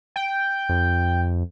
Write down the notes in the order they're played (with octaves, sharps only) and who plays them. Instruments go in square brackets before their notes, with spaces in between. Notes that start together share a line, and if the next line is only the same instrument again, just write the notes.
[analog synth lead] G5
[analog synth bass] F2